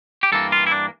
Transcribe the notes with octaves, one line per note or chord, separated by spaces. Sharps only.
G4
G2 E3 A#3 A4
F4
E4
D4